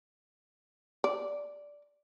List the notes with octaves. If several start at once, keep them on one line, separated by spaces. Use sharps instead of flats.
D5